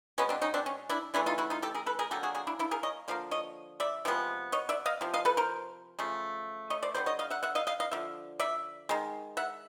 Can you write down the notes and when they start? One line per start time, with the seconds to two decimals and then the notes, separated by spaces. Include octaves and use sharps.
0.18 B2 G#3 B3 C#4
0.29 C4 D4
0.41 C#4 D#4
0.54 C4 D4
0.66 C#4
0.89 D4 E4
1.14 C#3 E3 A3 D4 E4
1.26 D#4 F4
1.38 E4 F#4
1.50 D#4 F4
1.62 G4 A4
1.74 G#4 A#4
1.86 A4 B4
1.99 G#4 A#4
2.11 D3 F#3 A#3 G4 A4
2.23 F#4 G#4
2.35 F#4 G#4
2.47 D4 E4
2.59 D4 E4
2.71 G#4 A#4
2.83 C#5 D#5
3.08 D3 F3 A#3 F5
3.31 C#5 D#5
3.80 D5 E5
4.05 C3 F3 G#3 B3
4.52 C#5 D#5
4.69 D5 E5
4.86 D#5 F5
5.01 C3 F3
5.14 D#5 F5
5.25 A4 B4
5.37 A#4 C5
5.99 C#3 F3 A3
6.70 C#5 D#5
6.83 C5 D5
6.94 D3 G3 B3 C5 D5
7.06 C#5 D#5
7.19 D#5 F5
7.30 E5 F#5
7.43 E5 F#5
7.55 D#5 F5
7.67 D#5 F5
7.80 D#5 F5
7.91 D3 F3 E5
8.39 D5 E5
8.89 D#3 G#3
9.37 E5 F#5